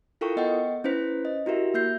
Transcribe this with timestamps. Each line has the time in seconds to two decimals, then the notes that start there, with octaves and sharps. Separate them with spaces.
0.21 E4 F4 A4 A#4 G5 C#6
0.36 B3 D#5 F#5 G5
0.84 C#4 E4 B4 C5 B6
1.25 D#5
1.46 E4 F#4 G4 A#4 E5
1.74 A#3 E5 G6 C7